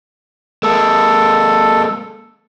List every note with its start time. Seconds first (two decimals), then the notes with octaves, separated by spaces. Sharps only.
0.63 G#3 A#3 A4